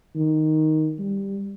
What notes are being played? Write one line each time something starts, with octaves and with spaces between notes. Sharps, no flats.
D#3
G3